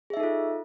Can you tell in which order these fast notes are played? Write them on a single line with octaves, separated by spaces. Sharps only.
G#4 E5 D#4 A4 F4